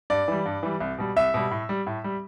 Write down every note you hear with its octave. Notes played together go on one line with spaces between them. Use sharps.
G2 D5
E3 G3
G2
E3 G3
C2
B2 G3
C2 E5
B2 G3
A2
G3
A2
G3